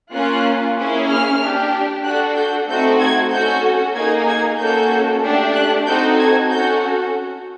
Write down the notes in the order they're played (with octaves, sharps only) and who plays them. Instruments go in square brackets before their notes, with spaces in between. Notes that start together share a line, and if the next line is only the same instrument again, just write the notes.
[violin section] A#3 C#4 F4 F#6
A#3 C#4 E4 G#4
F6
D4 G4
D4 F#4 A4 F#6
G6
A3 C4 D#4 F#4 A4 G6
G#6
C#4 F#4 A4 G6
A#3 D#4 G#4 G#6
G#6
A#3 C#4 F#4 A4 G6
A3 D4 G4
F#6
C4 D#4 F#4 A4 G6
G#6
C#4 F#4 A4 G6